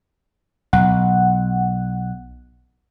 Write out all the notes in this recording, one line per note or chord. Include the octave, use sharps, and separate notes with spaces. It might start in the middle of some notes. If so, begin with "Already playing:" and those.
B1 F#5